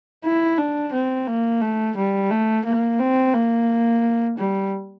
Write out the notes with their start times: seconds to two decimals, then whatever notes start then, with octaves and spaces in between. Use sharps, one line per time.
0.24 E4
0.58 D4
0.93 C4
1.27 A#3
1.61 A3
1.97 G3
2.30 A3
2.66 A#3
3.00 C4
3.34 A#3
4.38 G3